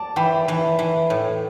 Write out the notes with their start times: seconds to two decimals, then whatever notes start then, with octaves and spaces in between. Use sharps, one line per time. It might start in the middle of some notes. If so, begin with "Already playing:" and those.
Already playing: D5 A5
0.16 E3 G5 B5
0.48 E3
0.79 E3
1.10 A2